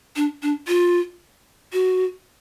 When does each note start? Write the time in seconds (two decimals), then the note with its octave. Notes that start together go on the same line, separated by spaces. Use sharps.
0.16 D4
0.42 D4
0.68 F4
1.73 F#4